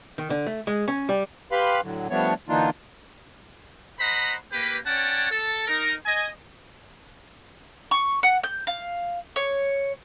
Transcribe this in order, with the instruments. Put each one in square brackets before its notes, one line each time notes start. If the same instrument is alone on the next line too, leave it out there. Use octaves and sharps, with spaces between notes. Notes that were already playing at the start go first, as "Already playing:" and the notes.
[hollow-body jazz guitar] D#3
D3
A3
G#3
C#4
G3
[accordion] G4 B4 F5 B5 C6
A2 D3 F#3
F3 G3 A3 B3 D4 C#5
D3 E3 A#3 D4 D#4 F4
[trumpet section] C5 D#5 F#5 A#5 B5
A#3 G4 B4
C#4 C#5 D5 F#5 G5 A5
A4
D#4 A#4
D#5 G#5
[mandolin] C#6
F#5
G6
F5
C#5